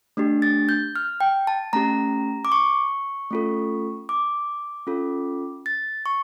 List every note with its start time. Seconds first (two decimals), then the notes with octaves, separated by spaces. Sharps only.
0.17 A3 D4 G4
0.42 A6
0.69 G6
0.96 F6
1.20 G5
1.47 A5
1.73 A3 C#4 G4 A#5
2.45 D6
2.52 C#6
3.31 A3 C#4 F4 A4
4.09 D6
4.87 C#4 F4 A4
5.66 A6
6.06 C#6